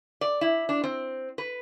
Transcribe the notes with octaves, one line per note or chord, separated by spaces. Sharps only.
D5
E4
D4
C4
B4